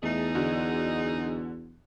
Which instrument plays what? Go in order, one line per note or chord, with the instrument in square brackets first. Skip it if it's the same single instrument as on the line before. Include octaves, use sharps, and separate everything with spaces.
[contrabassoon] E2 [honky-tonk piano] A3 [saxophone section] D#4 G#4 D#5
[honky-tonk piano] D3 F#4